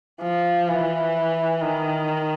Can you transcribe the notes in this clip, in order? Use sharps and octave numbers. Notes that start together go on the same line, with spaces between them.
F3
E3
D#3